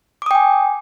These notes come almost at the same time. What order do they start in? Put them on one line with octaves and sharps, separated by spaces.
D6 D#6 G5 G#5